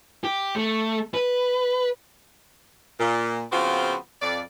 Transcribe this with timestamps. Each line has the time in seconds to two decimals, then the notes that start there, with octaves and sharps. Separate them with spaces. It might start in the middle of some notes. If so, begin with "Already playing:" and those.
0.24 G4
0.56 A3
1.14 B4
3.00 A#2
3.52 C#3 F3 B3 C4 F4 F#4
4.22 F2 D5